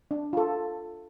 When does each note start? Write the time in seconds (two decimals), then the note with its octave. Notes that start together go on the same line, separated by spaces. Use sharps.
0.11 D4
0.33 F4 A4